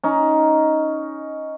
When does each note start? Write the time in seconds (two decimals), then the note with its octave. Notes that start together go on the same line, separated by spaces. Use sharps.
0.04 C#4 D#4